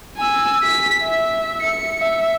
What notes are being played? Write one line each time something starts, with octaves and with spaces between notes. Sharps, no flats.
G#5 E6
B6
E5
C#7
E5